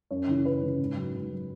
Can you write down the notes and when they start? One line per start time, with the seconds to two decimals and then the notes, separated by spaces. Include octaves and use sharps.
0.11 F#2 C#5
0.27 C#3 E3
0.45 F#2 B4
0.62 C#3 E3
0.79 G#2
0.96 F#3
1.14 G#2
1.32 F#3